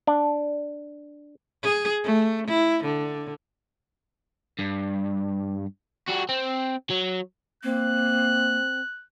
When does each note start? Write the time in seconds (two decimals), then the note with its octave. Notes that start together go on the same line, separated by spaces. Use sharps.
0.07 D4
1.63 G#4
2.04 A3
2.47 E4
2.84 D3
4.59 G2
6.09 G3 F#4
6.29 C4
6.90 F#3
7.63 A#3 C4 F#6